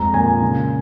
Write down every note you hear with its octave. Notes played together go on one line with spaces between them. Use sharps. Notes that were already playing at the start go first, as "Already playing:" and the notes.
Already playing: F2 G#3 A#5
A#2 G#5
C#3